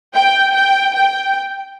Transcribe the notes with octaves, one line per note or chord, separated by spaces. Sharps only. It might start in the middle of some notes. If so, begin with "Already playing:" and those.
G5
G5
G5